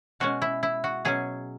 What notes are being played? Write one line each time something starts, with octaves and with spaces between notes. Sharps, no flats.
B2 G#3 C#4 F#4
E4
E4
F#4
B2 F#3 C#4 G#4